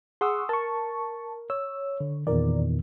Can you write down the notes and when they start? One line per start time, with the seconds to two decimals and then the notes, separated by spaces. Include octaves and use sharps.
0.21 G#4 F#5 C6 C#6 D#6 E6
0.49 A#4 A5 C#6
1.50 C#5 E6
2.00 D3
2.27 E2 A#2 D#3 A#4 D5